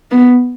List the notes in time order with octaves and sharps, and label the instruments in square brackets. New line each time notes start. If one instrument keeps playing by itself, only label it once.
[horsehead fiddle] B3